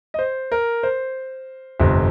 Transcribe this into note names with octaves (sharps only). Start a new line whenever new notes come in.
D#5
C5
A#4
C5
G1 F2 C3